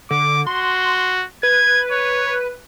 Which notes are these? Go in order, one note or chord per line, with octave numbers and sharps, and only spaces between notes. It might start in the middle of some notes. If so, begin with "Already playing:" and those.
D3 D6
F#4 C6
B4 G#6
C#5